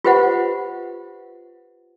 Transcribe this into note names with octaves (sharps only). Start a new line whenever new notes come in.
F4 G4 B4 C5 D#5 F#5